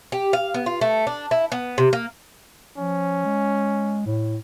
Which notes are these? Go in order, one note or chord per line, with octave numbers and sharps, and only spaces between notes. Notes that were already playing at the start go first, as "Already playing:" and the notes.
G4
F5
B3
F4
A3
D4
E4
B3
C3
A#3
F3 C#4
G#3
A2